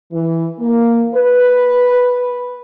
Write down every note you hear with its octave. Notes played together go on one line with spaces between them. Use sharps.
E3
A#3
B4